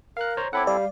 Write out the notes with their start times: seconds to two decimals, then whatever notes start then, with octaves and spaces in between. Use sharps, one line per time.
0.17 A#4 F5 F#6
0.37 C5 C#5 A#5
0.53 C4 E4 A4 C#5 F#5 B5 D6
0.67 G3 D5 F5